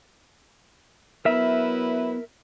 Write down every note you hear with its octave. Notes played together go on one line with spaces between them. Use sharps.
F#3 B3 E4 A#4 B4 E5